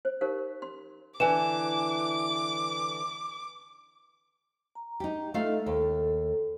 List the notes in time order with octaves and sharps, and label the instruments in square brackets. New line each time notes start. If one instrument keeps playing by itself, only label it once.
[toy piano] C5
D#4 G4 A#4 C5 F5
C6
[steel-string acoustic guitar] D3 E3 [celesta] G#5 E7 [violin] D6
[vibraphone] A#5
[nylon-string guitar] D#4 G4
[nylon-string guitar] A3 F4 F5 [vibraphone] D#4 A4 D#5
[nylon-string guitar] D#2 [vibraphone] A4